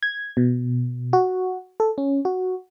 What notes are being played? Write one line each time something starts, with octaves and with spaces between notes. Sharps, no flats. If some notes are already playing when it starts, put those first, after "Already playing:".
G#6
B2
F#4
A4
C#4
F#4